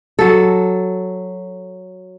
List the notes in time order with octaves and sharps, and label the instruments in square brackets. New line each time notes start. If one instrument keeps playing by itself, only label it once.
[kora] F#3 A4